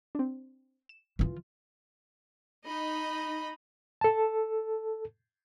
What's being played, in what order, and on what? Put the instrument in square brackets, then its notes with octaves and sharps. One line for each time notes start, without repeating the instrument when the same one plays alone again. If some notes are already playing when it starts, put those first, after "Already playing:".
[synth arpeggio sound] C4 D4
E7
[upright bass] E3 F4
[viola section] D#4 [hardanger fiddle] D#5 B5
[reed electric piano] A4 A5